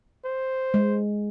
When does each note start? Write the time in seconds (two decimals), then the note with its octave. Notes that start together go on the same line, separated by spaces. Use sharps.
0.25 C5
0.74 G#3